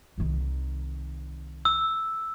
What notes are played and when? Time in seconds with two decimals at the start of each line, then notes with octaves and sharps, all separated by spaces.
0.18 C2 D#3
1.65 E6